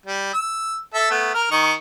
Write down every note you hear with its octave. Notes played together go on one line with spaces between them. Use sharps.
G3
E6
A4 E5
A3 B3
A#4 F6
D#3 D#5 C#6